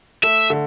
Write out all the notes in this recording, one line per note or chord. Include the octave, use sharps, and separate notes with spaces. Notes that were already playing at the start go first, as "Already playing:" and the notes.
A3 E5
D3